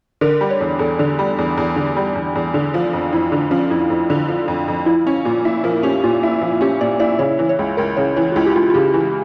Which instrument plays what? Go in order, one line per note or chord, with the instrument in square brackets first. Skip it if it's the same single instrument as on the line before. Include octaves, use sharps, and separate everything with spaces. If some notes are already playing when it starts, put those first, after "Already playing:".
[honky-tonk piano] D3 [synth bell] A#4
[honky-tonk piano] G3
[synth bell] C#5
[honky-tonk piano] E2
[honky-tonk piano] E2 [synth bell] A4
[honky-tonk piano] D3
G3
E2
E2
D3
G3
E2
E2
D3
F3
F2
[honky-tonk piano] F2 [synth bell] E4
[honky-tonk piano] D3 [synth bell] D4
[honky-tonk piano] F3 [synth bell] C#4
[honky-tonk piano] F2 [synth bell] E4
[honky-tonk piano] F2
D3
F3
F2
F2
[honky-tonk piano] F3 [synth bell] E4
[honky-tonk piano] C#4 [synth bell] E4
[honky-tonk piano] A#2 [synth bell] F4
[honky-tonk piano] E4
[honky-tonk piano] F3 [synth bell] A#4
[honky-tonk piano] C#4 [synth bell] G4
[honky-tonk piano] A#2 [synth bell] F4
[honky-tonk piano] E4
F3
[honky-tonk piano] C#4 [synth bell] G4
[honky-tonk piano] A#2 [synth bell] D5
[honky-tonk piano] E4 [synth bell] D5
[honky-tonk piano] C#3 [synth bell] C#5
[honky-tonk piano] E3
[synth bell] C#5
[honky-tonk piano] C#2
[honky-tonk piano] C#2 [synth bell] A#4
[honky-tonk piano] C#3 [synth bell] C#5
[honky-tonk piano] E3 [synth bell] C#5
[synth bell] F4
[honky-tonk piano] C#2 [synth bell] E4
[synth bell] G4
[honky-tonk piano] C#2 [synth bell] F4
[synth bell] F4
[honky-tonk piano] C#3 [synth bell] G4
[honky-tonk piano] E3